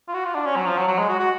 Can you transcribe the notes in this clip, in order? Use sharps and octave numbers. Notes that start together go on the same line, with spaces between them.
F4
F#4
F4
D4
C#4
F#3
F3
F#3
F#3
G#3
F#4
F#4